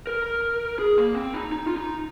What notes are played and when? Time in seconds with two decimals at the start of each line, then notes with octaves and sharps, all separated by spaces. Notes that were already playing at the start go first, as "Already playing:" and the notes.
0.07 A#4
0.79 G#4
0.98 A#3
1.16 C4
1.34 D#4
1.52 D#4
1.67 F4
1.76 D#4